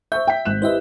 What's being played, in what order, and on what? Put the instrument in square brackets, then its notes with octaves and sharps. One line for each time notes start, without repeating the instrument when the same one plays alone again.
[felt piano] C5 C#6 G6 [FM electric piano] E5
[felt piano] G5 B6
G#1 F#6 E7
[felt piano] E4 G4 B4 [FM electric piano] C5 D#5 E5